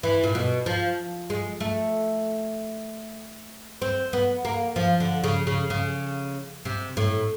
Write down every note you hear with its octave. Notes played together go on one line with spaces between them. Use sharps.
E3
A#2
B2
F3
G#3
A3
C4
B3
A#3
F3
D3
C#3
C#3
C#3
C3
A2